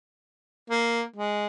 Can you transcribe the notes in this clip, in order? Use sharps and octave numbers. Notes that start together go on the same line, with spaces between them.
A#3
G#3